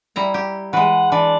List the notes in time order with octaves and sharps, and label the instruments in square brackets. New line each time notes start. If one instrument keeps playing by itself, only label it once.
[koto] G3 E4 A#5
G4
[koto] E3 G#3 [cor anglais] F#5
[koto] E3 [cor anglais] D4